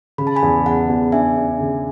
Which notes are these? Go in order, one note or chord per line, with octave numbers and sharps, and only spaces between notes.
C#3 B5
A5
G#5 B5
E2
E2 F#5 A5
E2
D4 E5 G#5
D4
C#3